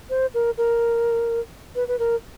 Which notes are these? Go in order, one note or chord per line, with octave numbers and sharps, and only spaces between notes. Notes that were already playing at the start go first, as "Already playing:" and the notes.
C5
A#4
A#4
B4
B4
A#4